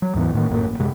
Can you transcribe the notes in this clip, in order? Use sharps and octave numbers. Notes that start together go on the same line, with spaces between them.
F#3
D#2 G#2 E3 B3
A2 D#3 A#3
A#1 F#2 A2 A#3
A1
F#2 C3 G#3